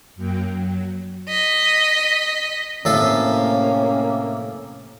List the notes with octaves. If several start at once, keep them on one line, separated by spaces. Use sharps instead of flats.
F#2 F#3 A#3 G5
F#3
D#5 B6
A2 C3 A#3 C#4 A4 F5